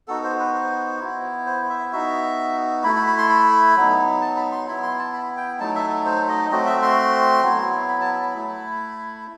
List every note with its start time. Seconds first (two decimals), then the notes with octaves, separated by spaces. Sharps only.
0.08 B3 D#4 F#4 A4
0.24 C5
0.39 B4
0.54 C5
1.00 B3 E4
1.46 C5
1.69 E5
1.92 B3 D#4 F#4 E5
2.84 A3 E4 B5
2.96 B5
3.07 B5
3.18 C6
3.29 B5
3.76 F#3 B3 D#4
4.21 A5
4.36 B5
4.52 C6
4.68 B3 E4 B5
4.83 C6
4.98 A5
5.13 B5
5.37 G5
5.59 F#3 A3 D#4 A5
5.75 E5
6.06 C5
6.29 D#5
6.51 A3 C4 F#4 D#5
6.66 E5
6.82 C6
7.43 F#3 B3 E4
7.88 B5
8.01 A5
8.12 B5
8.35 A3 E4